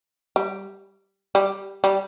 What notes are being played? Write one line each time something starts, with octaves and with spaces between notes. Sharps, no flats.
G3
G3
G3